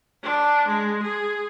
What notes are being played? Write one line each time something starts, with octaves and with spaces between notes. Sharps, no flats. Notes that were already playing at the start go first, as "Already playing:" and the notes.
D4
G#3
G#4